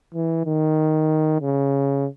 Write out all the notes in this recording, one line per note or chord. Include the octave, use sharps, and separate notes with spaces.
E3
D#3
C#3